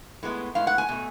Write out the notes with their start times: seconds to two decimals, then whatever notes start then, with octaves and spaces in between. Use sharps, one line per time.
0.23 A2 G#3 B3
0.55 A2 G#3 B3 F5
0.67 F#5
0.78 G#5
0.89 B2 A3